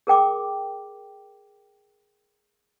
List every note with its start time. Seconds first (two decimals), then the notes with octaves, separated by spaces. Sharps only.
0.07 G#4 A#4 G5 D6